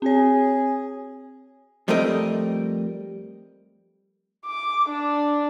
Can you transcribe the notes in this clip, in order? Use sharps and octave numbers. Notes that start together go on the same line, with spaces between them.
C4 G#4 C#5
F2 G3 A3 C4 A#4 D#5
D6
D4